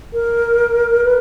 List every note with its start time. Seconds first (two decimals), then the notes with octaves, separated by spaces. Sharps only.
0.14 A#4
1.04 B4